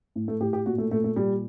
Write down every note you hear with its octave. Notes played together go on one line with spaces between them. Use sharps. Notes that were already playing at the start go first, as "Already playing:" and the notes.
A2
A3
A2 G4
G4
A#2 F#4
A3
A#2 A3
A3
A#2 G3